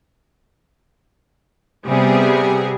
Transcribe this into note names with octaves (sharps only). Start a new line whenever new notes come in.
C3 G3 B3 G#4